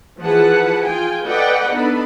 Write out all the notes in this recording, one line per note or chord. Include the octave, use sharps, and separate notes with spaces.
E3 F3 G#4 B4 F#5 A5
F4 G#4 G5 G#5
A4 B4 D5 D#5 F#5 G5
B3 D4 D#4 A4 B5